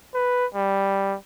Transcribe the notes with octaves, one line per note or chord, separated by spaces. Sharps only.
B4
G3